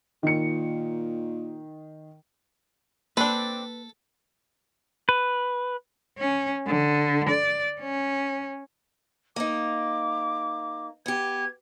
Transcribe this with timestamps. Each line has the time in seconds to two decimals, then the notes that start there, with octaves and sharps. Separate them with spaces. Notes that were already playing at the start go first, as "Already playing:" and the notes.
0.23 A#2 D#3 C#7
3.17 A#3 C4 D4 A4 B4
5.09 B4
6.18 C#4
6.67 D3
7.30 D5
7.81 C#4
9.36 A#3 D#4 D6
11.06 B3 G4 G#6